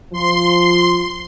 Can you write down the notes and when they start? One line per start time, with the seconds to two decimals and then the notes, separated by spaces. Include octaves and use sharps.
0.13 F3 C6